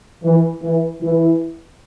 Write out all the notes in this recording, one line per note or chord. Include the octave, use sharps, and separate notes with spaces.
E3
E3
E3